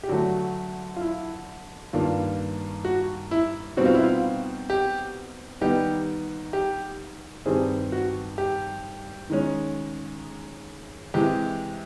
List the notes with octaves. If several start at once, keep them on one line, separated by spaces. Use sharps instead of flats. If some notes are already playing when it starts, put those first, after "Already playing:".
G4
D3 F#3 A3 F#4
F4
E4
G2 D#3 G3 A#3 D4 F4
F#4
E4
B2 G3 C4 D#4 F#4
F4
E4
F4
G4
D#3 G3 B3 D#4 G4
G4
G2 D#3 G3 C4 G#4
F#4
G4
D#3 G#3 C#4
C3 E3 G#3 G4